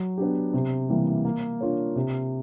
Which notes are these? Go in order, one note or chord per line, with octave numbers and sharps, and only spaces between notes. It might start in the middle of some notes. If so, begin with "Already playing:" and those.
Already playing: F#3
B3 D4 G4
C3
E3 G3 A#3
A#3
D4 F4 A#4 C#5
C3